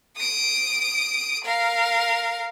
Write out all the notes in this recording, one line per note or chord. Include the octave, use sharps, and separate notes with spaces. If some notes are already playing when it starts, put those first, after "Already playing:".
D#6 D7
A#4 F5